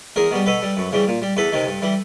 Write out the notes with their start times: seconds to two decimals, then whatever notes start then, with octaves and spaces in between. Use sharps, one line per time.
0.16 E2 G#4 A#4
0.31 B2 G3
0.46 B2 A4 B4
0.62 G3
0.77 F#2
0.92 C#3 E3 G3
1.07 A#2
1.22 G3
1.37 E2 A4 B4
1.52 C3 D#3
1.67 G2
1.82 E3 G3